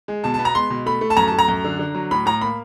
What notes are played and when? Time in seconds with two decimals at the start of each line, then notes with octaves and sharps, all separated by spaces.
0.08 G#3
0.24 B2 A5
0.34 A5
0.39 B3
0.45 A#5
0.55 G#3 C6
0.70 B2
0.86 A3 B5
1.01 A3
1.10 A5
1.17 F#2 A#5
1.27 A5
1.32 A3
1.39 A#5
1.48 F#2
1.64 D3
1.79 D3
1.95 F#3
2.11 A2 B5
2.26 A2 A#5
2.41 A#3 B5